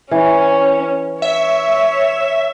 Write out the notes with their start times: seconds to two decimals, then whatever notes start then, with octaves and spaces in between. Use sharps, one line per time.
0.11 E3 C#4
1.22 C#5 E5